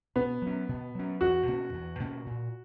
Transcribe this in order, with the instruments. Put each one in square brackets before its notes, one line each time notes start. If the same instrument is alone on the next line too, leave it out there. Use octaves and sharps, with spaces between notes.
[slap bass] B2 [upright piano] B3
[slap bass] F#3 C#4
B2
F#3 C#4
[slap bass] E2 [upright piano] F#4
[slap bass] B2 A#3 C#4
E2
B2 A#3 C#4
A#2